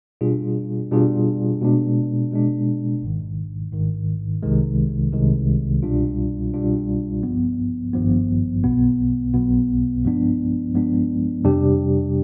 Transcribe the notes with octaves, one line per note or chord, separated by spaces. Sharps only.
B2 G3 D4 F4 G#4
B2 G3 D4 F4 G#4
B2 G#3 D4
B2 G#3 D4
G#1 G#2 D#3
G#1 G#2 D#3
C2 C3 D#3 G#3
C2 C3 D#3 G#3
C2 B2 G3 D4 F4
C2 B2 G3 D4 F4
G#1 G2 F3 B3
G#1 G2 F3 B3
B1 B2 B3
B1 B2 B3
G2 F3 G#3 B3 D4
G2 F3 G#3 B3 D4
F2 C3 G3 D4 G4